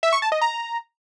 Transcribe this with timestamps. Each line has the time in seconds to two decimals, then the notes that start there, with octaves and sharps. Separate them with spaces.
0.03 E5
0.13 C#6
0.22 A5
0.32 D#5
0.41 A#5